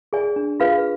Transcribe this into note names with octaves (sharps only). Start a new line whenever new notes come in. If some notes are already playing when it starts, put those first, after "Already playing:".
G#4 D5 G#5
D4
F4 G#4 B4 F5